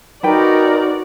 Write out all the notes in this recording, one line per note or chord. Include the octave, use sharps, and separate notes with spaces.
D#4 F#4 A#4 B4 D5 G5